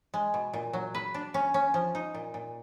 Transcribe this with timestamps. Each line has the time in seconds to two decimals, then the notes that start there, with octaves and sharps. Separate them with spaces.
0.14 G#3
0.34 B2
0.54 A#2
0.73 F#3
0.95 B4
1.14 D4
1.34 C#4
1.54 C#4
1.74 F3
1.95 D#4
2.14 A#2
2.34 A#2